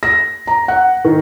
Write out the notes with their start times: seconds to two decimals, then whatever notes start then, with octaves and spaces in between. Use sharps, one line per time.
0.03 A#6
0.47 A#5
0.68 F#5
1.05 D#3